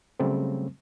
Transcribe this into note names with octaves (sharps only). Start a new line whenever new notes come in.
C#3 F#3 G3 A3 C4